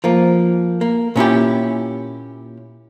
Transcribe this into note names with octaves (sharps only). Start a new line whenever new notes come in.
F3 A#3
A#3
A#2 C#4 E4 G4